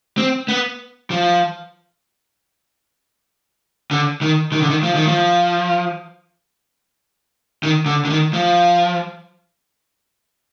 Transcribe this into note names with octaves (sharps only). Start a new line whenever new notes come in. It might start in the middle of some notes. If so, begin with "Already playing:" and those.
C4
B3
F3
D3
D#3
D#3
D3
D#3
F3
D#3
F3
D#3
D3
D3
D#3
F3